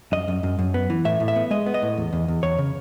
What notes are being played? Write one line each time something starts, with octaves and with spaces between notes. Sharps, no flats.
F#2 D#5
F#2
F#2
F#2
B3
E3
A2 E5
A2
E5
B3
G#3 D#5
B3
D#5
A2
E2
E2
E2
E2 C#5
C#3